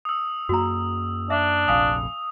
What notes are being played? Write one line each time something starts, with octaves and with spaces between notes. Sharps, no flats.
D#6 E6
F#2 A#3 F#4 A#5
D4 E5
F1 A#1 F2 F5 G#5 D#6